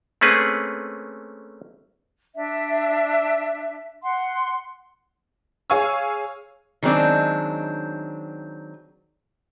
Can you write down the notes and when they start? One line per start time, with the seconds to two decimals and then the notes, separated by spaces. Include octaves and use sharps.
0.21 A3 A#3 C4 C#4 G#4 B4
2.35 D4 E5
4.03 F#5 C6
5.70 G#4 C#5 F5 G#5 C#6 E6
6.83 D#3 F#3 G#3 C4 D4